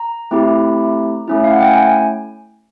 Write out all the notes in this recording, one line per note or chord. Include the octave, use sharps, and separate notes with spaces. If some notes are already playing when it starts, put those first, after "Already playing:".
Already playing: A#5
A3 C4 E4 G4
A3 C#4 E4
F5
F#5
G5
G#5